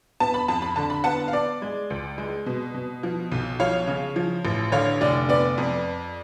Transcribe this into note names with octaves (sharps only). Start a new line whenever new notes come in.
B3 A5
B5
F2 A5
B5
D3 A5
B5
B3 F#5 A5
F5
B3 D5
G#3
C#2
G#3
B2
B2
F3
B1
F3 C#5 F5
C#3
F3
A1
D3 C#5 F5
F1 D5
B3 D5
F2